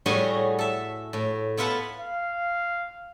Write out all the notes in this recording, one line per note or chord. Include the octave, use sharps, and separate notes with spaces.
A2 G3 F#4 G#4 C#5 G#5
A4 E5
A2
B3 E4 F4 B4 F#5 A5
F5